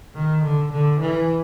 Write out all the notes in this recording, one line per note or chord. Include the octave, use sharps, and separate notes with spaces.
D#3
D3
D3
E3